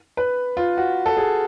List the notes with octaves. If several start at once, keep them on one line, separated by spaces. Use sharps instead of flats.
B4
F4
F#4
A4
G#4